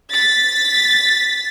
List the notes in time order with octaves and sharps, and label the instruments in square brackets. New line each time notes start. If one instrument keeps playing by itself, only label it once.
[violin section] A6 B6